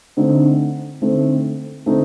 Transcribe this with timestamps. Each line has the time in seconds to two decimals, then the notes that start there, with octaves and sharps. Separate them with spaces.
0.17 D3 A3 C4 D#4
1.02 D3 A3 C4 D#4
1.86 D3 A3 C4 D#4